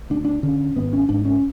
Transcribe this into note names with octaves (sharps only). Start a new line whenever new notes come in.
D2 D4
D4
D3 C#4
G#1 B3
C#4
G#2 D4
C#4